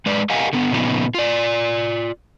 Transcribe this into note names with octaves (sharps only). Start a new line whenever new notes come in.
G#3 B4 D5
G4 A#4 D#5 F5 F#5 G#5
D3 B3
A#2 C#3 F3 B3 D#4
F4 D5